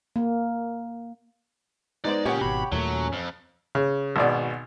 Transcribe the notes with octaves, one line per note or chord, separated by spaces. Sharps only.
A#3
G#3 B3 D#4 C5 D5
A#2 C#4 G4 G#4 C#5 F#5
G#1 B2 B5
D#2 A#2 F#3 A3 C#4
F2
C#3
G#1 B2 D5